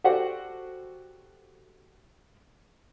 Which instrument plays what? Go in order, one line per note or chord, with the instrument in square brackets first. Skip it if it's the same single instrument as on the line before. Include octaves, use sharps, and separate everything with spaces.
[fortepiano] F#4 G4 A4 C5 D5 F#5